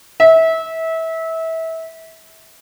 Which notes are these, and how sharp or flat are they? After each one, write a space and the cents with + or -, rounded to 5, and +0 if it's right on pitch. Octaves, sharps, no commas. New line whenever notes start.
E5 -25